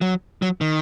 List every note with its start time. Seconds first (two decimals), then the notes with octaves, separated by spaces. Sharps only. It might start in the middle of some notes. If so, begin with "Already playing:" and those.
0.01 F#3
0.42 F#3
0.61 D#3